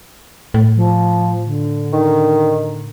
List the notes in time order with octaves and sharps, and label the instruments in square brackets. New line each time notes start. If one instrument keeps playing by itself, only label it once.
[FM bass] A2
[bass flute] F3
D3
[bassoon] D#3